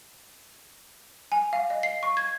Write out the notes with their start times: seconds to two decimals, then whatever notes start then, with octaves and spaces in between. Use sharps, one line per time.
1.32 G#5
1.53 F5
1.70 D#5
1.83 C7
2.03 C#6
2.17 G#6